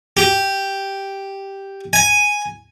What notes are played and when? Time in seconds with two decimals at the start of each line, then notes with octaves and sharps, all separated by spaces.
0.17 G4
1.93 G#5